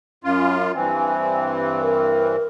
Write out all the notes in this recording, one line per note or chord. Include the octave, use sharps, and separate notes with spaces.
F#2 C#4 F4
G2 E3 C4 G#5
A#4